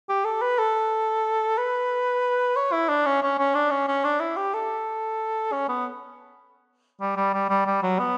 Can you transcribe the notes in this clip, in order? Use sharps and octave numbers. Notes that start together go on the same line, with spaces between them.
G4
A4
B4
A4
B4
C#5
E4
D4
C#4
C#4
C#4
D4
C#4
C#4
D4
E4
G4
A4
C#4
B3
G3
G3
G3
G3
G3
F#3
B3